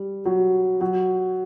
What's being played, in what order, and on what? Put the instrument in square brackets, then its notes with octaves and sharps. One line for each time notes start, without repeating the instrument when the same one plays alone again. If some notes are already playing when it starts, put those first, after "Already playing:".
Already playing: [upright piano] G3
F#3
F#3